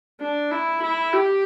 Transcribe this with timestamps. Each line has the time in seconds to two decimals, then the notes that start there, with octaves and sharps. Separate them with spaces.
0.20 D4
0.51 E4
0.82 E4
1.13 G4